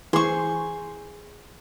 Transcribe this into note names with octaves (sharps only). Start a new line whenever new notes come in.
E3 G#4 C5 C6 C#6